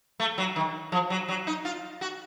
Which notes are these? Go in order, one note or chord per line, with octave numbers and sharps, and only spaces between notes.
A3
F#3
D#3
F3
F#3
F#3
D#4
F4
F#4